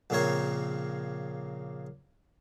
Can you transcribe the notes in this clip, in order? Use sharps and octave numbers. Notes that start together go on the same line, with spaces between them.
A#1 A#2 C#3 C4 A#4 C#5